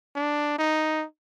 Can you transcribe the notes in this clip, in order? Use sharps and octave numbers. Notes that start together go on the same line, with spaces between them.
D4
D#4